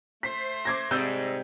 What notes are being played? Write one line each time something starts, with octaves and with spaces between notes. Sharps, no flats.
A3 C5 B6
D6 G#6 A#6
G#2 C3 G3 D5 A5 E6 G6